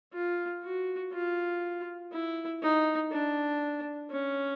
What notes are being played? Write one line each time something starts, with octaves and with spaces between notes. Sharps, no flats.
F4
F#4
F4
E4
D#4
D4
C#4